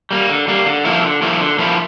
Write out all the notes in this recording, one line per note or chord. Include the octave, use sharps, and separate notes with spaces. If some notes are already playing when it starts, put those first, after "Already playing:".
G3 A#3
D3
G3 A#3
D3
F3 A#3 E4
D3
F3 A#3 E4
D3
F3 A#3 E4